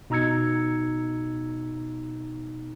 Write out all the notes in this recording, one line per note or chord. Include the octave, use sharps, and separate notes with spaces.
B2 D#4 A#5 E6 G#6 C#7